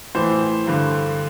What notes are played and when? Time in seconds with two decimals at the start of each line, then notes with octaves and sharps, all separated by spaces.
0.15 A2 E3 C5
0.67 G2 D3